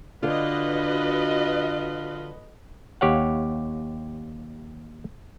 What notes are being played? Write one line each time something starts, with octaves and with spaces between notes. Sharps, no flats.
D3 F4 F#4 B4 D#5
D#2 G4 C#5 F5 F#5